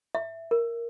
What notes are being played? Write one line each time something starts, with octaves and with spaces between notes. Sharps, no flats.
E5
A#4